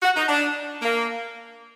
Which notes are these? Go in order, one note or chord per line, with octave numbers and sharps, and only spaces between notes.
F#4
D#4
D4
A#3